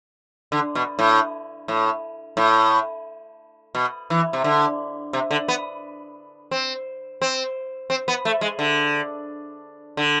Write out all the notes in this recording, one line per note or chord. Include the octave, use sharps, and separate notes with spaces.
D3
B2
A2
A2
A2
B2
E3
C3
D3
C3
D3
B3
C4
C4
C4
B3
A3
G#3
D3
D3